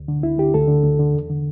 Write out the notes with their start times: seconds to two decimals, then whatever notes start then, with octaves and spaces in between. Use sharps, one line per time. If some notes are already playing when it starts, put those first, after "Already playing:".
Already playing: D2
0.08 D3
0.23 D2 E4
0.38 D3 G4
0.54 D2 A4
0.68 D3
0.83 D2
0.99 D3
1.15 E2
1.30 D3